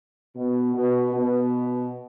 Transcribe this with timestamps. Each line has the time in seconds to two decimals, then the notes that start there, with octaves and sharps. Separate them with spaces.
0.35 B2
0.74 B2
1.14 B2